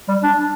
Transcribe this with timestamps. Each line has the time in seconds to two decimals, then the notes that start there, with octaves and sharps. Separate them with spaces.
0.08 G3
0.23 D4